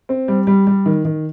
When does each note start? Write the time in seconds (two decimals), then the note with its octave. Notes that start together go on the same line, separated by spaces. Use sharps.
0.09 C4
0.28 G3
0.47 G3
0.67 G3
0.86 D#3
1.05 D#3